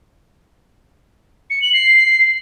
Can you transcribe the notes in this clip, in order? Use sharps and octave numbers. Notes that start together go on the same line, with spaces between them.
C#7
F#7
C7